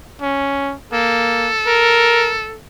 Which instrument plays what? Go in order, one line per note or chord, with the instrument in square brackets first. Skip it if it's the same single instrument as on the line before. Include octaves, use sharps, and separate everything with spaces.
[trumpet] C#4
[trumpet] A#3 [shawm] A4
[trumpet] A#4